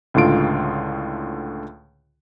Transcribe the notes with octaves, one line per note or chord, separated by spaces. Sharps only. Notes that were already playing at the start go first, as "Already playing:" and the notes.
C#2 A2 D3 F4 D7